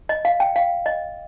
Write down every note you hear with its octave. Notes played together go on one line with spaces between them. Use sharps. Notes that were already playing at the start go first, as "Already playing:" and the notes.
D#5
F5
G5
F5
D#5